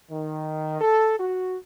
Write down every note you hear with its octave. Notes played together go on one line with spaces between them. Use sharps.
D#3
A4
F#4